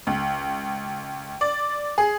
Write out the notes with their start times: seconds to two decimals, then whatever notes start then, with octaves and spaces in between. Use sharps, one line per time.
0.07 C#2
1.41 D5
1.98 G#4